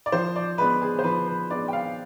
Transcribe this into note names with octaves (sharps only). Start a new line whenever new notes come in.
D5
F3 C5
D5
G#3 B3 D4 B4
G#4
C5
F3 B4
B4
G#3 B3 D4 D5
G5
F5